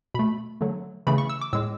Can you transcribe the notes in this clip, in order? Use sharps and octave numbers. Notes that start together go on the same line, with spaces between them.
B2 A3 B5
D3 F#3 A3
C#3 E3 A3 B5
C#6
E6
D6
A2 G#3 E6